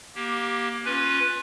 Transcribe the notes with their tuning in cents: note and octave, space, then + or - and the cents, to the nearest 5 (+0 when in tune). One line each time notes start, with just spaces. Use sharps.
A#3 +25 G4 -5
C#4 +0 F4 +20 B4 +0